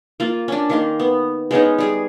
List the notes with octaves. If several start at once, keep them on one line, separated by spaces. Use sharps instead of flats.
A#3 F4
C#4 D4
D#3 A#3 C6
B3
G#3 B3 C#4 D#4
G3 G#4